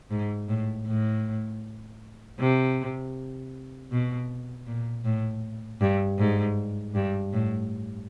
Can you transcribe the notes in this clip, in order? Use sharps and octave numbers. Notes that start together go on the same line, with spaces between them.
G#2
A2
A2
C3
B2
A#2
A2
G2
G#2
G2
A2